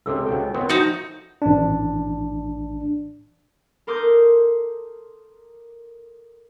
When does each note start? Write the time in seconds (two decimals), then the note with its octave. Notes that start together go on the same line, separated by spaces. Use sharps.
0.06 C#2 C3 A4 D6 E6
0.26 C#2 F#4 G5
0.41 D#5
0.54 B3 C4 A#4 C#5
0.69 F3 D#4 F#4 E5
1.42 A1 D4
3.87 A4 A#4 C6 D6 D#6 G6